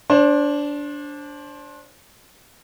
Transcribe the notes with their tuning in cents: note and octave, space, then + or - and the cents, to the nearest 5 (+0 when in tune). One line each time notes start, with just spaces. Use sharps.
D4 -15 C5 +25